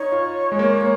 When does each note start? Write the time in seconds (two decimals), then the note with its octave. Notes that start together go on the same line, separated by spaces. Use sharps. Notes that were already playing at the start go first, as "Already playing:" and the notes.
Already playing: D#4 C#5
0.12 F4
0.52 G#3
0.59 A#3
0.81 A#3